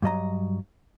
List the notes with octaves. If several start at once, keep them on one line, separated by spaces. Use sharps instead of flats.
G2 F#3 D#5 A#5